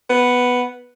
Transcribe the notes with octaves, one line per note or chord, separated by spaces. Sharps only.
B3